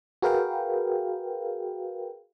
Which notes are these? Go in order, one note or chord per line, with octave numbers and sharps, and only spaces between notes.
F#4 G#4 A#4 B4 F5 G5